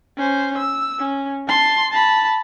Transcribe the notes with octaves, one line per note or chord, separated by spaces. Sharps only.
C#4 C5
E6
C#4
A5 C6
A5 B5